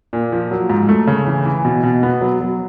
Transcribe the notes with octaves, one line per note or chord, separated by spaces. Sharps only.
A#2
F3
F#3
G#2
A3
C#3
E3
E3
B2
B2
B3
F#3
F#3